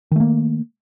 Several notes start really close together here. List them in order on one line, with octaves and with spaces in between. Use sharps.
D#3 A3 A#3